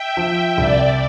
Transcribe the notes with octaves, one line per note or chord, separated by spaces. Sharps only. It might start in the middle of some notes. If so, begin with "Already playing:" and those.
Already playing: E5 G5
F3
C2 D5